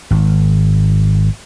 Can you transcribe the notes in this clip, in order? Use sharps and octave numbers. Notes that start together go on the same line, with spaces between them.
G#1